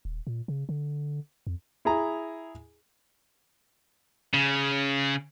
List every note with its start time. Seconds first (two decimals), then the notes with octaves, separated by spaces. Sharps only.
0.05 D#1
0.27 A#2
0.48 C#3
0.69 D3
1.47 F2
1.85 E4 G#4 A#5
4.34 C#3